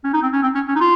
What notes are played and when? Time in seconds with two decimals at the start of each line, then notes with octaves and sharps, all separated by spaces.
0.04 C#4
0.13 D#4
0.23 C4
0.33 C#4
0.42 C4
0.55 C#4
0.68 C#4
0.76 D#4
0.80 F4